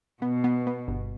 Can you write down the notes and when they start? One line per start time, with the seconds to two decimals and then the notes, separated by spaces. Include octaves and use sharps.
0.22 B2 B3
0.44 B3
0.67 B3
0.88 G1